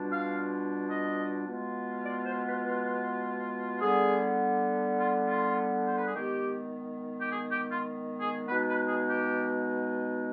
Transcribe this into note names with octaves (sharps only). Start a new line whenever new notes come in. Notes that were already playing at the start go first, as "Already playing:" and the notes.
Already playing: B2 G3 D4 F4
F5
D#5
B2 G#3 B3 F4
D5
C5
B4
B4
D3 G3 B3 G#4
F4
F4
C5
B4
G#4
D#3 G#3 B3 G4
G4
G#4
G4
F4
G#4
B2 G#3 B3 D#4 B4
B4
G#4
G4